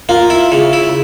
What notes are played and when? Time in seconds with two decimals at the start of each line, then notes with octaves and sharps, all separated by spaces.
0.09 A#3 F4
0.30 E4
0.52 C#3
0.73 E4